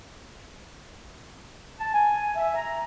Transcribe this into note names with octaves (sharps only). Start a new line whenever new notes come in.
A5
G#5
E5
A#5